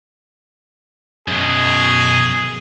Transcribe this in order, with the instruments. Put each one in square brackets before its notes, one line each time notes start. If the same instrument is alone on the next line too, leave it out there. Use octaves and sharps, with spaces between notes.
[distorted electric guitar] F#2 B2 [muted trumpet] G#4